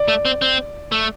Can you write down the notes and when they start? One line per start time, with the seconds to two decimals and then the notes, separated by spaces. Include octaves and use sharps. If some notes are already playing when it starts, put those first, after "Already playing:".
Already playing: D5
0.08 A3
0.25 C4
0.42 C4
0.92 A3